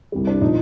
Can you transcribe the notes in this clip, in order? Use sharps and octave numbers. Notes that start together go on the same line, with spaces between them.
C2 C3 G3
D4
A#2 F3 D#4